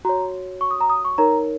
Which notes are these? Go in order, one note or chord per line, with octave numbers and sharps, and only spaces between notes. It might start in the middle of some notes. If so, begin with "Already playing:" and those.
F#4 C#5 A#5
C#6
D#6
A#5
D#6
C#6
D#4 A#4 C#5 A#5